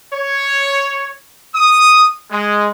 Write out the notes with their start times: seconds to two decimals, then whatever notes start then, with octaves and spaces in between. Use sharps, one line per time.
0.14 C#5
1.54 D#6
2.31 G#3